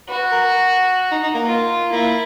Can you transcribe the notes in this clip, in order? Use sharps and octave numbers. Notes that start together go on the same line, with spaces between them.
F#4 B4
A#4
D#4
D#4
A#3
F4
A#3 E4